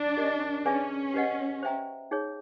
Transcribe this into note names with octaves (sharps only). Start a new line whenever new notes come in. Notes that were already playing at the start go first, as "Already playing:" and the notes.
Already playing: D4
G4 A#4 D#5
C#4 G#4 B4 D5 F5 G#5
G4 B4 D#5 F#5
C5 E5 G5 A#5
D#4 G#4 C#5